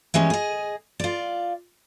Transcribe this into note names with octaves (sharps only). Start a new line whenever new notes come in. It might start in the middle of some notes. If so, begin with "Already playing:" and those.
E3 G3 G#3 C#4
G#4 D#5
F4 D5